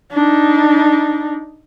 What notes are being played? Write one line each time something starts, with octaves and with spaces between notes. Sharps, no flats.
D4 D#4